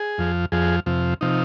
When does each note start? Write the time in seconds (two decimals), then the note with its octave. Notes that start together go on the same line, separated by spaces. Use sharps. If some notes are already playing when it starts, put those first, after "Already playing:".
Already playing: G#4
0.18 F2 F3
0.52 F2 F3 G#4
0.86 F2 C3 F3
1.21 C3 F3 D#4